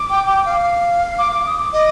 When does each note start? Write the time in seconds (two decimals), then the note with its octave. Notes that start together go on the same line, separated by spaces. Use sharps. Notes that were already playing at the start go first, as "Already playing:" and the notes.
Already playing: D6
0.10 G5
0.27 G5
0.45 F5
1.19 D6
1.32 D6
1.46 D#6
1.59 D6
1.73 D#5 D6